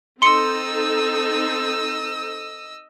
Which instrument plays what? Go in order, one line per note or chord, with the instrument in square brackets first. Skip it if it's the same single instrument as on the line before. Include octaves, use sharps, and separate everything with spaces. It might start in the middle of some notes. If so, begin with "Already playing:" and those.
[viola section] C4 D#4 A4 [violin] D#5 E6 [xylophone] C6 C#7